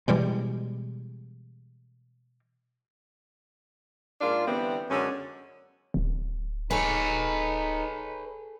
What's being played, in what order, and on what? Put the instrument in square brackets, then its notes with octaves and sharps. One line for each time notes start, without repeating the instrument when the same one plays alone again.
[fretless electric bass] B2 E3 G3 G#3
[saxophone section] G#2 A#3 D4 F4
D3 E3 G3 B3 C4
F#2 D3 G#3 C#4
[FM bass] D1
[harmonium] D#4 [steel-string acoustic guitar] G#4 A4 [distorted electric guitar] B4 C#5